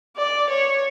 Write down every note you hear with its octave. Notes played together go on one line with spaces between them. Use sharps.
D5
C#5